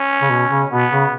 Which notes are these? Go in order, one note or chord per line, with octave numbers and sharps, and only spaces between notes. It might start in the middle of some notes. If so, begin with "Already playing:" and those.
Already playing: C#4
C#3
B2
C#3
B2 B3
C#3